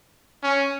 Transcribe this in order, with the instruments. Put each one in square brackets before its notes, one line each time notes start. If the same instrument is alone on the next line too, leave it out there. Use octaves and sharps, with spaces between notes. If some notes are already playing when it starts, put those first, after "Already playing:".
[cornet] C#4